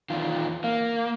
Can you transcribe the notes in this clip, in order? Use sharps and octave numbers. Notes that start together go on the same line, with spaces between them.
E2 D#3 F4
A#3 F5